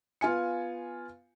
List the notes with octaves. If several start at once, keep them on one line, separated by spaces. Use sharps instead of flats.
B3 F4 F5 G#5 C#7